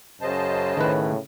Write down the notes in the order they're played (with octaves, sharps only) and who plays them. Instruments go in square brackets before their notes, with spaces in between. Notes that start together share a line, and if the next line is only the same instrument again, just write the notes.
[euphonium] F#2 [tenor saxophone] C#3 [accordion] C5 D#5 A5
[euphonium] A2 [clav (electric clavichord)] D#3 B4